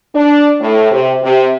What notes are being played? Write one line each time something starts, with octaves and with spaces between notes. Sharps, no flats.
D4
A2
C3
C3